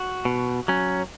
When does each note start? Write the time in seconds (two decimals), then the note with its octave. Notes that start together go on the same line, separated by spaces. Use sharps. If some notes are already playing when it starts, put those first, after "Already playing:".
Already playing: F#4
0.25 B2
0.68 F#3 C#4